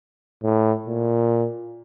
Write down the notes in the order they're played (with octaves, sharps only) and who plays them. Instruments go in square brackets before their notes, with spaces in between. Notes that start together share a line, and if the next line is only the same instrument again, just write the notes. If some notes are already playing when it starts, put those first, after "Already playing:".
[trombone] A2
A#2